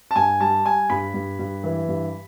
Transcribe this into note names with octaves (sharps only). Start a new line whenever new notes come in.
A5
G2 G#5
G3 A5
G3 G#5
G2 B5
G2
G2
E3
G2